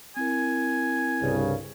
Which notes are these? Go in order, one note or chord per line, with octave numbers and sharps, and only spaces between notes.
C4 E4 A#4 G#5
C2 G2 C#3